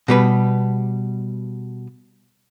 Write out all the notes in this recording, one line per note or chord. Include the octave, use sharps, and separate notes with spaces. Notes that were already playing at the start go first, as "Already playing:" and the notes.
B2 G3 B4